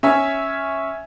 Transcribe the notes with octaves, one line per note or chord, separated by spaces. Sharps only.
C#4 E5 G#5